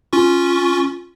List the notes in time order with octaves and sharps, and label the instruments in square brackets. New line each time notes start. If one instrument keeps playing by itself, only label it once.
[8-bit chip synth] C#4 F4 C#6